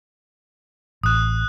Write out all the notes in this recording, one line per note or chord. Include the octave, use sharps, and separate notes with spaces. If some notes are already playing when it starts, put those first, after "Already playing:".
A1 D#6 F#6